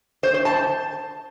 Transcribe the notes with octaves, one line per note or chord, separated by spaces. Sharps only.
C5
C5
A5